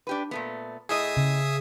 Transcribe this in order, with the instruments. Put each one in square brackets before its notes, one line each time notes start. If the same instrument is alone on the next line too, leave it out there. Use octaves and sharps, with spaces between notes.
[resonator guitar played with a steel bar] D4 G4 B4
A#2 A3 B3
[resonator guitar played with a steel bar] A2 D#5 [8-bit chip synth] G#4 E5 D#6
[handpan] C#3